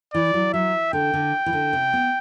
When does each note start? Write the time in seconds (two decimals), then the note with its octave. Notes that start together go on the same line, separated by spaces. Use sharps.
0.14 E3 D5
0.34 F#3
0.54 F#3 E5
0.93 D3 G5
1.14 D3
1.46 E3
1.53 D3
1.73 C3
1.93 B3